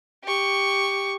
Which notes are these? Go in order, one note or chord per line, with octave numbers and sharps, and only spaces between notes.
G4 C#6